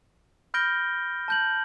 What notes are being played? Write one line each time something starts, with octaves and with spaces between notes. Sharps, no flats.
B5 F6 G6 A#6 D7 G7
A5 G6 F#7